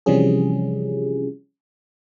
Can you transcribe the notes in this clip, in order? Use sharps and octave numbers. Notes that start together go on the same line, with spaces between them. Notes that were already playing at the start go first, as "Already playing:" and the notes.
C3 E3 F3 G3 C#4 G#4